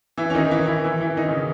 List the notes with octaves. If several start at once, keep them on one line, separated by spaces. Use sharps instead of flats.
E3 E4
C#4
D#3 D#4
E3 E4
E3 E4
E3 E4
E3 E4
D#3 D#4
C#3 C#4